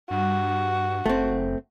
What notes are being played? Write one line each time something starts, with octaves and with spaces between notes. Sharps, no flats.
G2 F#4
F#1 A3 C4